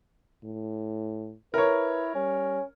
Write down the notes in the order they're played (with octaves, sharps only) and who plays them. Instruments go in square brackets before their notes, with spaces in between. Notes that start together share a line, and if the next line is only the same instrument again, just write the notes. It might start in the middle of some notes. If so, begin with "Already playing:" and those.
[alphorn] A2
[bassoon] E4 [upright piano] A#4 C#5 [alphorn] B4
[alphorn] G3 [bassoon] C#4